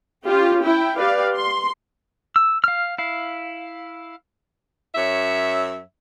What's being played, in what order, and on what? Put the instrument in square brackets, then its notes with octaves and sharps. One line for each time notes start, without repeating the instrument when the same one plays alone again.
[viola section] C#4 F4 G4
E4 G5
G4 B4 D5 F5
C6
[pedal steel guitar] E6
F5 F6
E4 F5
[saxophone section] F#2 C#5 E5